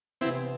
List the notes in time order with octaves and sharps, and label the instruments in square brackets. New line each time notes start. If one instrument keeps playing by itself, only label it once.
[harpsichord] C3 E3 B3 [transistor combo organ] C4 E4